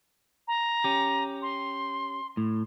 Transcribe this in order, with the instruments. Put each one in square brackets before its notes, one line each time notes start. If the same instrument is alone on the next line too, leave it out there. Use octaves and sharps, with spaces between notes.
[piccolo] A#5
[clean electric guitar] C#4 G4
[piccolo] C6
[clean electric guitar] A2